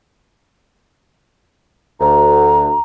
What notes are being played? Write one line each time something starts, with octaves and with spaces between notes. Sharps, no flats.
D2 A#5